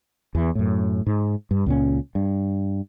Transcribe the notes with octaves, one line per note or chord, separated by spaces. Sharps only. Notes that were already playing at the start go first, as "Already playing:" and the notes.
E2 E3
F#2 A2
G#2
G2
C#2 A#2 C#4
G2